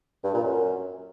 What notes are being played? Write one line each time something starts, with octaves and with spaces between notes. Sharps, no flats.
G2
A#2
F#2